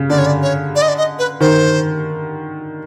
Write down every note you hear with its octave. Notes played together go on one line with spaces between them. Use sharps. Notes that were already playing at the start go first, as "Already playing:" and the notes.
Already playing: C#3
D3 D5
C#5
D5
C#5
D5
D#5
D5
D#5
B4
D#3 C5